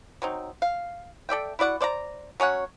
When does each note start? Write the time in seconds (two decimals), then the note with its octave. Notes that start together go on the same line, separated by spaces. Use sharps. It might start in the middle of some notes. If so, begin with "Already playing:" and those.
0.22 F#3 C4 D#4
0.62 F5
1.29 A4 D5 E5 G5
1.59 E4 F#4 D5 F#5
1.81 C5 D5 F5 A#5
2.40 F#3 C#4 C#5 F#5